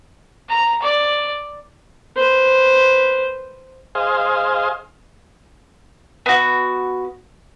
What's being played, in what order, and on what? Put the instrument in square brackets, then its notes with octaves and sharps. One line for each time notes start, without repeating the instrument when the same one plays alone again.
[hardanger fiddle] A#5
D5
[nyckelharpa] B4 C5
[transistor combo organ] G#4 C5 D#5 F5
[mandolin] B3 F#4